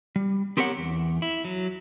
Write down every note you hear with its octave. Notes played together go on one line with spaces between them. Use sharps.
G3
B3 C4 G4 A#4 C#5 F#5
E2
E4
F#3